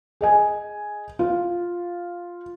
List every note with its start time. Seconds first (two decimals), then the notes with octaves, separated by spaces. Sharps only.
0.21 G#4 D#5 G#5
1.19 F4